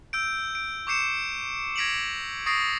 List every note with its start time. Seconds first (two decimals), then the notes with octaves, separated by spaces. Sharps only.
0.13 E6 G6 D7
0.55 D7
0.87 C#6 D6 G6 C7 C#7 E7
1.76 G#6 A#6 B6 D7 F7 F#7
2.46 C#6 D#6 A6 A#6 C7 D7